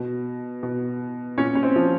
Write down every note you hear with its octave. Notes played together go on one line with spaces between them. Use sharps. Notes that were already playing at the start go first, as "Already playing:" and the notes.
Already playing: B2
B2
A#2 C#4
C#4
C4
F3